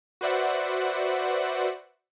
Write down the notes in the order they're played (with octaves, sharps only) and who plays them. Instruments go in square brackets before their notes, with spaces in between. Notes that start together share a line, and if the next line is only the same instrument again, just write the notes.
[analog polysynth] F#4 B4 C5 D5 E5 F#5